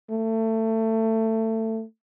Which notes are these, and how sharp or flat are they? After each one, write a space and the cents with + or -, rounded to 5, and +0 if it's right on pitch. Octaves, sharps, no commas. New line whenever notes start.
A3 +20